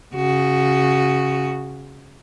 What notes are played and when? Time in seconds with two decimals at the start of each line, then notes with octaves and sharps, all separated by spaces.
0.15 C#3 F#4